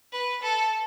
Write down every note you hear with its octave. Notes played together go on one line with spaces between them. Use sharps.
B4
A4